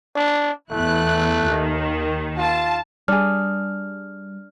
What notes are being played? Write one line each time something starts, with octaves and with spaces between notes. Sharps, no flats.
D4
E2 A3 E4 F#6
D#2 D#3
F4 A5
G3 D4 G#4 F6